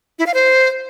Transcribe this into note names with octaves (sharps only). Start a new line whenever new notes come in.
E4
F5
C5